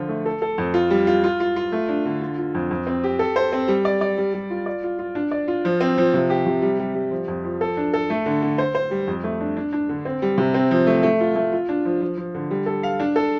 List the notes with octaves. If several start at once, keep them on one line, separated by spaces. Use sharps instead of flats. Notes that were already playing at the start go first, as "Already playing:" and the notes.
Already playing: D3 F3 F4
A3
A4
A4
F2
F4
G3
F4
F4
F4
F4
A3
D4
D3
F4
F4
F2
F2
C4
G4
A4
C5
C4
G3
D5
D5
G3
G3
F4
D5
F4
F4
D4
D5
F4
F3
C4
F3
C3
G4
C3
G3
G3
G3
F3
F2
F3
A4
D4
A4
A3
D3
D3
C5
C5
G3
F2
A3
D4
D4
D4
D3
C4
G3
C3
C4
F3
A3
A3
F4
A3
F4
D4
F3
F3
F3
D3
G3
A4
F5
D4
A4